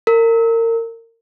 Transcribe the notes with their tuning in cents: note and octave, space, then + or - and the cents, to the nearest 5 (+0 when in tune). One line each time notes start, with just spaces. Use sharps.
A#4 -30